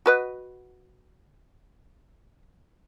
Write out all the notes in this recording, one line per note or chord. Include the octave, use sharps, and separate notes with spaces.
F#4 B4 D#5